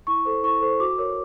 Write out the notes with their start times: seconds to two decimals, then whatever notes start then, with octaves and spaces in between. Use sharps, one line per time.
0.07 E4 C#6
0.25 A4 C5
0.43 E4 C#6
0.61 A4 C5
0.80 F#4 D6
0.98 A#4 C#5